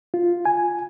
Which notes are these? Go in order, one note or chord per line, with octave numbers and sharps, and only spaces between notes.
F4
G#5